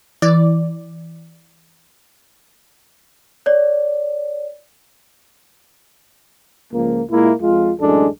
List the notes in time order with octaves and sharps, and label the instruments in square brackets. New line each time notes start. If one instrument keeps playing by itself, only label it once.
[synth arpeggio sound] E3 D5
[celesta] C#5 D5
[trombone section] C#2 F3 A#3
A#2 G#3 A#3 E4
F2 G#3 F4
A1 F#2 G#3 D4 A4